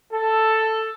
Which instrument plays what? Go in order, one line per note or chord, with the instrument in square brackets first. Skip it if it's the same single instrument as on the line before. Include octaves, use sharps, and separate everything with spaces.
[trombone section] A4